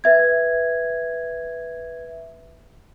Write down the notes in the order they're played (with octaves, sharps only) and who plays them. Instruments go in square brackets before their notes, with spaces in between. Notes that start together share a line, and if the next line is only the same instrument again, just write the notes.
[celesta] B4 E5 G#6